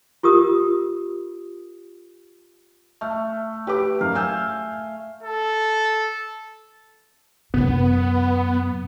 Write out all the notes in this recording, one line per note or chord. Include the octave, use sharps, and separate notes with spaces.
F4 G4 A#4 D#6
A3 F6
G4 B4 D6
F#2 F5
G#5 E6 G6
A4
F#2 C3 B3